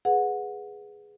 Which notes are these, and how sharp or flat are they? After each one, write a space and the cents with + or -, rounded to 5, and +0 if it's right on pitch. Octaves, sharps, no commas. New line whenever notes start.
G#4 +0 B4 +0 F#5 -20